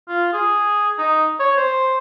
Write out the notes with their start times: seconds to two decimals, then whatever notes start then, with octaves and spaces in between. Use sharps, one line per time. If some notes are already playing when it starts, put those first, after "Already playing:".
0.08 F4
0.33 G#4
0.98 D#4
1.39 C#5
1.57 C5